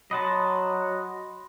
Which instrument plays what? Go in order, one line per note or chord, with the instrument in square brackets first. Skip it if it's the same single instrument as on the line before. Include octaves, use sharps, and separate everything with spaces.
[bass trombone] F#3 [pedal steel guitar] D#5 F#5 A5 [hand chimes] B5 C6